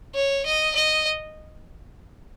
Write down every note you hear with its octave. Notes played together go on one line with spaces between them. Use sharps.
C#5
D#5
D#5